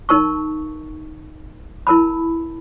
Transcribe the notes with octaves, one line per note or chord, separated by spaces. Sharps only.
D#4 A#4 A5 C#6
E4 A#4 A5 B5